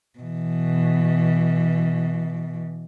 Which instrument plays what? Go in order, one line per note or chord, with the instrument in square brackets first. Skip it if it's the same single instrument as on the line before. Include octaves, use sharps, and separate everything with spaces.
[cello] B2 E3